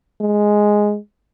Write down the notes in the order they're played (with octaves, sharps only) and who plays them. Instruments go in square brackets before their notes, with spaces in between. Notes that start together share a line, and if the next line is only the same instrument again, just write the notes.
[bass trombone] G#3